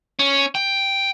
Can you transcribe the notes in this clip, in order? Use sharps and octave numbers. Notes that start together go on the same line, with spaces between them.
C#4
G5